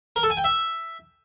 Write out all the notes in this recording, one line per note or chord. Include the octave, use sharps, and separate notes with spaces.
A#4
A4
G#5
G5
E5